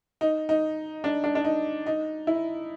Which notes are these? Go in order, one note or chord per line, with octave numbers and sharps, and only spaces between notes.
D#4
D#4
D4
D4
D4
D#4
D#4
E4